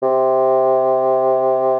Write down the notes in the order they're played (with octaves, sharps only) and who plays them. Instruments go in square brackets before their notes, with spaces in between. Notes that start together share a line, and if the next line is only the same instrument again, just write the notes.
[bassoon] C3